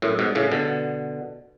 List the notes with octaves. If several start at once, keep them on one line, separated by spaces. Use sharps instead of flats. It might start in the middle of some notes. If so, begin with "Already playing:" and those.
F#2 A2
G#2 B2
A2 C#3
B2 D3